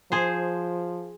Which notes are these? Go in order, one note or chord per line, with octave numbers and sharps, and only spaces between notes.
F3 G#4 C5